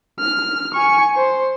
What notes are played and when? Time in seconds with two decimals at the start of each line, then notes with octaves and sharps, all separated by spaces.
0.20 F6
0.74 G#5 C#6
1.16 C5